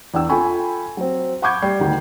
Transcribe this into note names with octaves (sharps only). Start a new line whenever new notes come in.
E2 D4 G5 E6
F4 A4 G5 G#5 B5 C#6
F#3 C4
F#5 B5 C#6 D6 G6 G#6
G3 C7
D2 D#3